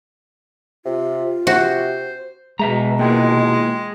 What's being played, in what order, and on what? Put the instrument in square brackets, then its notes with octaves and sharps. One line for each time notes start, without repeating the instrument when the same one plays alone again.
[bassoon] C3 [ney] F4
[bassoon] C3 [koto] F#4 [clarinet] C5
[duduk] B2 [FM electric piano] G#3 [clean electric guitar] B4 E5 A#5
[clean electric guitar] D#2 A#2 E3 [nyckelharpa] G#3 [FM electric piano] A#3 G5